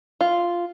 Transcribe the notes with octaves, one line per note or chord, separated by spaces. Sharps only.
F4